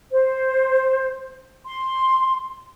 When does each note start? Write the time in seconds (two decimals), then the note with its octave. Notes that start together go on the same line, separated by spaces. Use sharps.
0.11 C5
1.66 C6